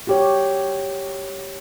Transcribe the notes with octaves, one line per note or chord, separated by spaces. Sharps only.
F#4 G4 C#5